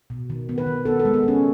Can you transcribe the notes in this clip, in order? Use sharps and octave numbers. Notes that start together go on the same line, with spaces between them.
B2
D#3
B3
B4
D#3
B3 A4
A4
G#3
B3
G#3 C#4